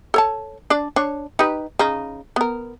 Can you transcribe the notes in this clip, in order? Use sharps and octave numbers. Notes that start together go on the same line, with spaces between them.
A4 C#5 A5
D4 D5
D4 C#5
D#4 G4 B4
C#3 D#4
B3 A#4